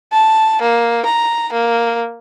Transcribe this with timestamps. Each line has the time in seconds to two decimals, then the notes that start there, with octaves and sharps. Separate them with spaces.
0.12 A5
0.61 A#3
1.06 A#5
1.53 A#3